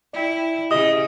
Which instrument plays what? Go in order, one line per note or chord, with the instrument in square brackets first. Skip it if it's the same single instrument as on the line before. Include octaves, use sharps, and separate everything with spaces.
[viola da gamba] E4 [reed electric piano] D5 G5
[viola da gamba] C#3 [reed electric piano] G4 E5 [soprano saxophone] D#5 [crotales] D#6